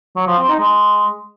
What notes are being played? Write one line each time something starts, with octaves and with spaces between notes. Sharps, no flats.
F#3
F3
C4
D#4
G#3